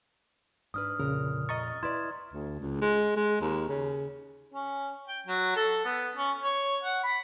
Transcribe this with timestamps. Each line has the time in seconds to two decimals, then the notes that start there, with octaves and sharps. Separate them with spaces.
0.74 G#2 D4 B4 D#6 F6
1.00 F2 A#2 C#3 A#4
1.49 D#5 A#5 C#6 A6
1.83 E4 B4 D5 C6 G#6 E7
2.33 D2
2.60 C#2
2.81 G#3
3.16 G#3
3.41 D#2
3.69 C#3
4.52 C#4
5.08 G5
5.27 F#3
5.56 A4
5.85 B3
6.16 C#4
6.41 C#5
6.82 F#5
7.04 B5